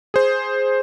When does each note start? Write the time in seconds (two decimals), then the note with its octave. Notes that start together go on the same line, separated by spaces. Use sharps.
0.14 G#4 C5